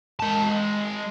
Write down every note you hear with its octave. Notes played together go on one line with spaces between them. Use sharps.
G#3 A5